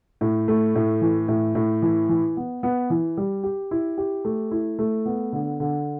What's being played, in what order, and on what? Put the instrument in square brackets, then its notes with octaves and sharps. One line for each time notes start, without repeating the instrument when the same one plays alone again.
[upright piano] A2
A3
A2
E3
A2
A2
E3
E3
B3
B3
E3
G3
G4
E4
G4
A3
E4
A3
B3
D3
D3